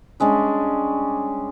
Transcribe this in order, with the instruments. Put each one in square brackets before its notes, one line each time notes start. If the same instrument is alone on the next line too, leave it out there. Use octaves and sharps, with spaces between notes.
[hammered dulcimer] G3 G#3 C#4 D4